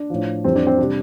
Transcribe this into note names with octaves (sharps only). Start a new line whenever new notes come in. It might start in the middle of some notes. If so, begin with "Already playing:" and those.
Already playing: D4
A2 F3
F2 E3 G3 C4
D4
C4
C3 G3 D4